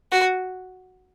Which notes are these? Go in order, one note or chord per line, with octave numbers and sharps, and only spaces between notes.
F#4